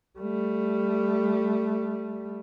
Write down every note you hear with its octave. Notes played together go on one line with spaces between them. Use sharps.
G3 A3